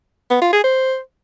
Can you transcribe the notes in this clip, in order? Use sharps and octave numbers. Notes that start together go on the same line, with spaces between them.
B3
F4
G#4
C5